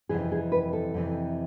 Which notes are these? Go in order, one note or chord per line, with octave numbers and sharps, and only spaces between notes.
F2 C3 E3 G#4
G#4
B4
A4
F2 C3 E3